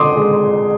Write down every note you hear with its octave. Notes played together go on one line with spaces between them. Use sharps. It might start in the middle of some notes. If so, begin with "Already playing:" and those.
Already playing: D3 C6 D6 D#6
G#3